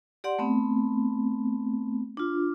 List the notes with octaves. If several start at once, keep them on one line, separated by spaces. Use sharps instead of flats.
G4 D5 F#5 C6
A3 B3 C4
D4 F4